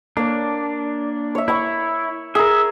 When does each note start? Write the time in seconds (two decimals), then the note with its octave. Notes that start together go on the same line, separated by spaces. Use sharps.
0.17 A#3 D4 C#5
1.35 C#5 E5
1.48 E4 E5 B5 C#6
2.35 G#4 A#4 E5